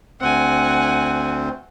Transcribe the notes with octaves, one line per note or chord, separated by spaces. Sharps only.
D2 C4 F#5 G#5